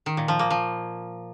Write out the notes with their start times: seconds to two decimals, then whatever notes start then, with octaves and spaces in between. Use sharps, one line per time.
0.06 D#3
0.17 A#2
0.28 F3
0.39 A#3
0.50 F3